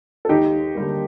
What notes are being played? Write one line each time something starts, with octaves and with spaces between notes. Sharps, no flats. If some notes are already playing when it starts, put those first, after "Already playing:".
A4
D#2 D#4 G4
D3 G3 A#3